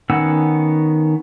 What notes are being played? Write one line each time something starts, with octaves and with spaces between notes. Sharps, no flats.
D#3 B3 C#4 F#5 E6